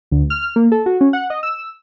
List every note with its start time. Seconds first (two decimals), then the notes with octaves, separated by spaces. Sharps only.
0.11 D2
0.30 F6
0.56 A#3
0.72 A4
0.86 F#4
1.01 C#4
1.13 F#5
1.30 D#5
1.43 E6